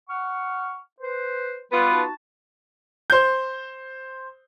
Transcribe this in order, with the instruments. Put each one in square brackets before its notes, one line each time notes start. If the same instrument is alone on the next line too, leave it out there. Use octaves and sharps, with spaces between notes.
[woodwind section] F#5 C#6 F6
B4 C5
[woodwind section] G3 [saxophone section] B3 F4 B4
[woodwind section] D#4 F#4 A5
[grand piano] C5 G6